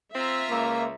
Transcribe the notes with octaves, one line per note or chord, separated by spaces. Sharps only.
C4 F4 E5 A#5
C#2 A#3